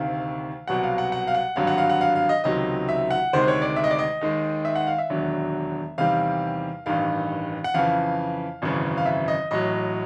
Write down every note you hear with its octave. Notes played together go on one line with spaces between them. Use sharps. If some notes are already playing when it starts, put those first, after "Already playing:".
Already playing: D2 C3 D#3 F5
C2 B2 F#3 F#5
F5
F#5
F#5
F5
F#5
G#1 G2 D3 F#3 F5
F#5
F5
F#5
F5
F5
D#5
C#2 C3 D#3 F#3 D#5
E5
F#5
D2 C3 D#3 G#3 C5
C#5
D5
E5
D#5
D5
D#5
D#2 D#3 G#3
E5
F#5
F5
E5
E1 D#2 D3 F#3
E2 C3 D#3 G3 F5
A1 G2 D#3 F5
F#5
F2 C#3 E3 F5
G#1 F#2 C#3 E3
F5
E5
D#5
A1 A2 F#3 D#5